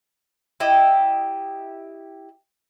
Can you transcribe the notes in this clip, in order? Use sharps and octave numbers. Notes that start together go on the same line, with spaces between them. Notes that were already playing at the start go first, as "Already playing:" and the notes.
E4 G4 D#5